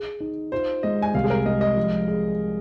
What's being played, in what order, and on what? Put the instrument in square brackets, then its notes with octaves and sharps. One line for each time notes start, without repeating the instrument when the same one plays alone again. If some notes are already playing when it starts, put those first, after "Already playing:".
Already playing: [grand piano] G#4
D#4
[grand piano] F4 [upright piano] C5
[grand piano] G#3 [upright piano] D#5
[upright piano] G#5
[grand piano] C2 [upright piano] F5
[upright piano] G#4
A#4
[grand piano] G#3 [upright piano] D#5
[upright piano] D#5
[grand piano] F3
G#4